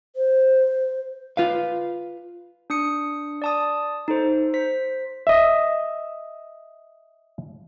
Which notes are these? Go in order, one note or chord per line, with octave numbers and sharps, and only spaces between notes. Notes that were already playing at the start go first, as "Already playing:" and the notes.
C5
F4 B4 F5
D4 D#6 C#7
D5 A5 D#6
D#4 A4 C5
C5 B6
D#5 E5